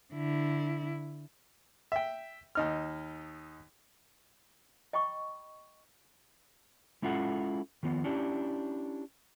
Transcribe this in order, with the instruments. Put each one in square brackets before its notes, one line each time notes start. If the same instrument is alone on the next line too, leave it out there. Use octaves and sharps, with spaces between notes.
[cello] D3 E4
[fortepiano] E5 G5
D#2 D#4 F6
[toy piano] D#5 G5 B5 C#6 D6
[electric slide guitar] G#3 C#4 E4 F4 A4 F#5
D#3 F3 B3
C#4 D4 E4 G4